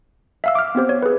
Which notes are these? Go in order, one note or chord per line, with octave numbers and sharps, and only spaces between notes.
E5 F5 E6
D6 F6
B3 C4 G4 C5
C#5
G#4 B4